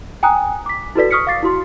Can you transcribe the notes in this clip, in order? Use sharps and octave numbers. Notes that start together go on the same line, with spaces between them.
G5 G#5 A#5 D#6 F#6
D6 B6
E4 F#4 A4 B4 D5 B6
C#6 D#6 F6 B6 C#7
F5 D6 A6 C7
E4 F#4 C6